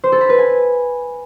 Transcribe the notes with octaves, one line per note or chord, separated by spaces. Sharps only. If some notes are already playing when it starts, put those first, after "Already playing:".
C5
A4
B5
B4
G#5